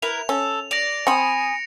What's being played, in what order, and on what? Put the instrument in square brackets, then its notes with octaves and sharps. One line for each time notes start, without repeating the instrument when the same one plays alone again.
[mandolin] E4 A#4 B4 [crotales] F7
[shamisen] C#4 [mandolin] A4
[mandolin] D5 [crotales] A#6 D7 F7
[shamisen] C4 G5 [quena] G#5 [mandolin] B5 D#6 [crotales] C#7